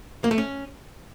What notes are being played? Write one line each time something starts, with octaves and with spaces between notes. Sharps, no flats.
A#3
A3
C#4